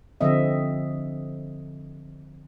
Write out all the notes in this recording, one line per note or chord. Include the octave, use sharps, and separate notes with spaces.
D3 F3 C4 D#5 E5